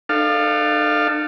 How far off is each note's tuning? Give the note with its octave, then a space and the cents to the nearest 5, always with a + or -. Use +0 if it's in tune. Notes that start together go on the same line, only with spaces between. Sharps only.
D4 +45 A4 +5 F5 +0